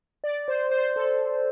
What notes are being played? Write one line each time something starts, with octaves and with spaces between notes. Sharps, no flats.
D5
C5
C5
A4